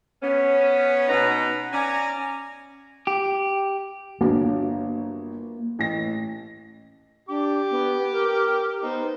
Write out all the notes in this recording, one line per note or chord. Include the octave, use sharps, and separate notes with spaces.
B3 C#4
B2 B3 D#4 B4 A#5
C#4 D5 G#5 A#5
G4
G1 F#3 A#3 D4
A1 A#6
D4 G4 D6
B3
A#4
B3 D#4 C5